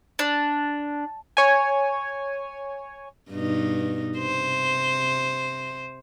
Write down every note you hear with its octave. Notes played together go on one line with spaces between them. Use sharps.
D4
C#5 G#5
G2 B2 D#4
C3 C5